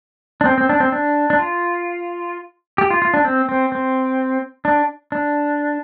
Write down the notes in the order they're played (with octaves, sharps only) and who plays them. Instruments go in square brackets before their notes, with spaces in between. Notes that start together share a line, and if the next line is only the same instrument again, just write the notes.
[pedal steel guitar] D4
C4
C4
D4
C4
D4
D4
F4
G4
F4
F4
D4
C4
C4
C4
D4
D4